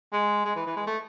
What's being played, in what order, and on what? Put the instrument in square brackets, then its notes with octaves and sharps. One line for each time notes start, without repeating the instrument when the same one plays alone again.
[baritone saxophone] G#3
G#3
E3
E3
G#3
A3